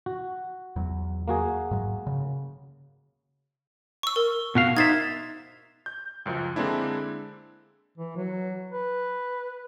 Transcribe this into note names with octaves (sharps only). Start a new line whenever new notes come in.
F#4
E2 F#3
A#3 F#4 G#4
G#2 F#3
C#3
C#6 E6
A#4
B2 F#4 F5
D#4 C5 E5 G#6 A6
G6
C#2 F#2 F3
D3 G#3 A#3 C4 D4 E4
E3
F#3
B4